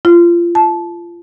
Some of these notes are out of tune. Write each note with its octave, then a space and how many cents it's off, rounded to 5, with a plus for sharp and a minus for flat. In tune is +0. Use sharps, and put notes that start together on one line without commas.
F4 -25
A5 -20